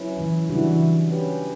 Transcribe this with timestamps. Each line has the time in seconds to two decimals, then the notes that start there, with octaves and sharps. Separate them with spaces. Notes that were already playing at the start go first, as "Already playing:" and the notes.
Already playing: F#3 C#4 E4 B4
0.18 E3
0.49 C#3 E3 G3 D4 F#4
1.10 C#4 G4 B4